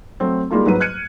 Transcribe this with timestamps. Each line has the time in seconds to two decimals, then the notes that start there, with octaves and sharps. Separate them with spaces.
0.20 F#3 A3 C4
0.51 G3 G#3 A#3 D#4 F4 A4
0.66 G#2 F#3 B4 D#7
0.80 F6 F#6 G#6 C#7 D#7